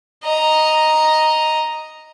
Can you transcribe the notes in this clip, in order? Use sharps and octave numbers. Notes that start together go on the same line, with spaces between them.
D#5 A#5